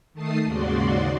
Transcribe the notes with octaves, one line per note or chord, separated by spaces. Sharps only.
D#3 A3 A5 D#6 C7
D#2 G#2 C#3 F#4 D5 C6